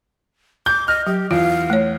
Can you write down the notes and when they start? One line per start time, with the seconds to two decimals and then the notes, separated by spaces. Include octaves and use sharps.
0.66 D6 G6
0.88 D#5 F6
1.06 F#3 G4
1.31 E2 F4 F5
1.70 A3 C#5